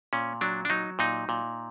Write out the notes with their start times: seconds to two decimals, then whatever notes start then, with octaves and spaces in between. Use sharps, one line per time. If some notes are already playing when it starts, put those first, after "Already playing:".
0.13 A#2 C#4
0.41 F#3 D4
0.65 D4
0.70 F#3 D#4
0.99 A#2 D#4
1.29 A#2